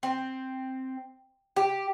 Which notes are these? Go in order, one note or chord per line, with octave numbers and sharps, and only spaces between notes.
C4
G4